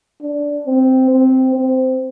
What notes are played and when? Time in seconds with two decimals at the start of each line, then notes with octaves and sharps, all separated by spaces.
0.21 D4
0.66 C4
1.10 C4
1.55 C4